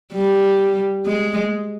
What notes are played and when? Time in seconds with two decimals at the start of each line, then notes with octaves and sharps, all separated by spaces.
0.13 G3
1.06 G#3